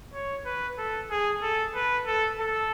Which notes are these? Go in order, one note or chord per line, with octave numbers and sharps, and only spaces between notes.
C#5
B4
A4
G#4
A4
B4
A4
A4